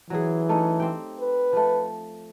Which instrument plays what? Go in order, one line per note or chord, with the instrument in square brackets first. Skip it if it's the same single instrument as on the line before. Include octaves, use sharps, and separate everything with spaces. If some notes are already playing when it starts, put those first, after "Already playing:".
[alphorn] E3 [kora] F#3 C#4 G#4
[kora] A3 C#4 D#4
C4 G4 G5
[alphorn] B4
[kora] F3 A3